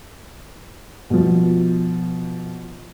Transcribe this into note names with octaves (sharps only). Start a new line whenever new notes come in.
B2 F3